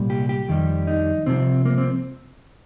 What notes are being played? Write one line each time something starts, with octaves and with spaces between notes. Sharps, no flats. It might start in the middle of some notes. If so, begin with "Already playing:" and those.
Already playing: C2 A#2 G3
G4
G4
F2 D#3 G3
D#4
C2 C3 F3 C4
A#3
C4